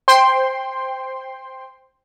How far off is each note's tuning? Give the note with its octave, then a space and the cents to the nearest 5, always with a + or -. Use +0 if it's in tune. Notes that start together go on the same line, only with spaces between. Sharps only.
C5 +0 G5 +10 C6 +0